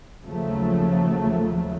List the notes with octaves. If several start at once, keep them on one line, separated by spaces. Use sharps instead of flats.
D#2 C#3 F3 F#3 A3